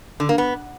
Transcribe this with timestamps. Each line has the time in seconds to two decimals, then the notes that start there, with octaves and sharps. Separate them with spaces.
0.20 D3
0.29 A#3
0.38 B3